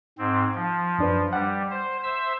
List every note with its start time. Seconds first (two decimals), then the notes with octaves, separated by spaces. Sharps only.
0.18 G#2 C4
0.55 F3
0.99 F#2 D4 B4
1.33 G3 F#5
1.70 C5
2.03 C5 E5 E6